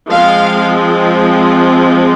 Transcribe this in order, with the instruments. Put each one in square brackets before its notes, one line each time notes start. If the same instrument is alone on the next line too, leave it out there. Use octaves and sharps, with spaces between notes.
[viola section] F3 G#3 C4 F5